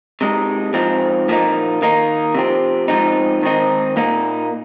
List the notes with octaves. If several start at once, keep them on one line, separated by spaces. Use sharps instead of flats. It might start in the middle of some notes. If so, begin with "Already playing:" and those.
C3 G#3 D#4
G#2 F3 C4 D#4
A#2 F3 A#3 D#4
D#3 A#3 D#4
C3 F3 C4
G#2 F3 C4 D#4
G#2 D#3 C4 D#4
A#2 A#3 D#4